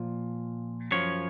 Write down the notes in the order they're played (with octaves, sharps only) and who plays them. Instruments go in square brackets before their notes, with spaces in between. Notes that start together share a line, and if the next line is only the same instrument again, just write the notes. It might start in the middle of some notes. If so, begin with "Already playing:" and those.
Already playing: [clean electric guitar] A#2 F3
F#2 F3 C#5